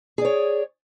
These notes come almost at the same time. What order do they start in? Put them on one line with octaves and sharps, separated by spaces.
G#4 D5 C#5